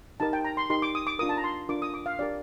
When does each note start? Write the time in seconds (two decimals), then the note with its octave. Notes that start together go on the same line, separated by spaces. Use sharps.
0.20 D#4 G4 A#4 A5
0.33 G5
0.45 A#5
0.57 C6
0.70 D#4 G4 A#4 C6
0.82 D6
0.95 D#6
1.07 D6
1.19 D4 F4 A#4 D#6
1.29 A5
1.37 A#5
1.44 C6
1.69 D4 F4 A#4 D6
1.82 D#6
1.94 D6
2.06 F5
2.19 D4 G4 A#4 D5